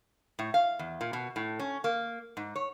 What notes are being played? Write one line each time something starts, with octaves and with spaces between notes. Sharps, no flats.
A2
F5
E2
A#2
B2
A2
C#4
A#3
G#2
C#5